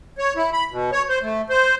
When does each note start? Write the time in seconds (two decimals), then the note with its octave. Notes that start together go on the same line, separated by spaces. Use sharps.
0.18 C#5
0.36 E4
0.53 B5
0.71 B2
0.92 C#5
1.09 C5
1.22 A3
1.50 C5